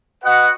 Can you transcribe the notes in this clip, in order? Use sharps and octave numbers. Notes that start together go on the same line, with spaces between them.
F#4 B4 D#5 F#5